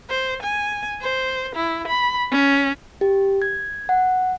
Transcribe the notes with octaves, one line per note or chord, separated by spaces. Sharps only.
C5
G#5
C5
E4
B5
C#4
G4
G#6
F#5